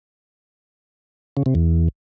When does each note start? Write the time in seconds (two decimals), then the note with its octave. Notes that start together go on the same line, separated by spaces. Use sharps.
1.37 C#3
1.46 C3
1.55 E2